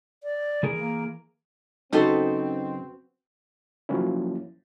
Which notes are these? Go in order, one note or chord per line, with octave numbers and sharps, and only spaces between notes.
D5
E3 G#4 A#4
A#3
F#2 C#3 C4 D#4 F#4 A4 B4 C5
F3 F#3 A#3 C#4 E4